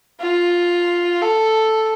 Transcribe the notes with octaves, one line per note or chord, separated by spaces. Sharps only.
F4
A4